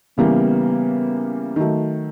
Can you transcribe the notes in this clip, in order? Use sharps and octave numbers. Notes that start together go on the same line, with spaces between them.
C#3 E3 G3 A#3 B3
D#3 F#3 A3